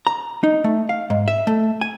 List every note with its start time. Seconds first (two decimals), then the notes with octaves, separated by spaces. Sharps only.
0.07 A#5
0.43 D#4
0.64 A3
0.89 F5
1.10 G#2
1.28 E5
1.47 A3
1.81 G#5